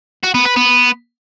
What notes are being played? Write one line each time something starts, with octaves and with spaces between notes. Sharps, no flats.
F#4
B3
B4
B3